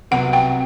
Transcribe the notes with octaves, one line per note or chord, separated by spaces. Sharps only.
C2 C3 F#3 B3 F#5
G5